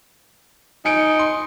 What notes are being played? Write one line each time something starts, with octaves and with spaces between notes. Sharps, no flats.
D#4 G#5 C#7 D7
C6